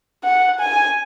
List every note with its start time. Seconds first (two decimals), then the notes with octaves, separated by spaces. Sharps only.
0.24 F#5
0.60 G#5